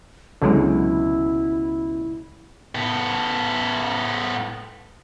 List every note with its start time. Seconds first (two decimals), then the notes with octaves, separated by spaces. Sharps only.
0.42 C#2 B2 D3 F#3 G#3 E4
2.75 A2 B3